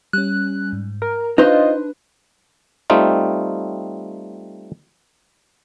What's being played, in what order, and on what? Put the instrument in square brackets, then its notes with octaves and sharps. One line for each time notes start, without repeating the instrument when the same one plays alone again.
[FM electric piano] G3 C#4 [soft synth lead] F#6
[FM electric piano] G#2
[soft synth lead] A#4 [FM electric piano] A#5
[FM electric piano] D4 [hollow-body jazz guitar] D#4 C5 [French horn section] F4 D#5 [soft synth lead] B4
[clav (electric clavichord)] G3 A3 C4 D#4 F4